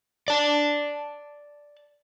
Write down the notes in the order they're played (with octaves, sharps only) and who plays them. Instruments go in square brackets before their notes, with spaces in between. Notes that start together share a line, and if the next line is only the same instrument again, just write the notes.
[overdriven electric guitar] D5 A5